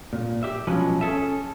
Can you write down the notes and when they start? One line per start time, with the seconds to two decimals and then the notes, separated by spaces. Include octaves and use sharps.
0.13 A#2
0.43 G4 E5
0.67 B2 F3 F#3 G#3 C#4 B4
1.01 C#4 G#4 A4 E5